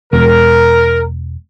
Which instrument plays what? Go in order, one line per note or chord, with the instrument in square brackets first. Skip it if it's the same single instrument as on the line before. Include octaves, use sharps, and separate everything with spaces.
[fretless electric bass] E1 [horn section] A#4